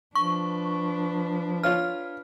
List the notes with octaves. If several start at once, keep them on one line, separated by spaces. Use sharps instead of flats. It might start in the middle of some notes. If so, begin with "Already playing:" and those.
F3 D4 B4 C#6
F4 C#5 F5 F6